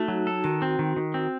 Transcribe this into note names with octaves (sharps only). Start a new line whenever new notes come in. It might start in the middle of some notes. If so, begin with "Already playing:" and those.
Already playing: A3 D#4 F#4
F#3
A4
D#3 F#4
C4
D#3
D#3
C4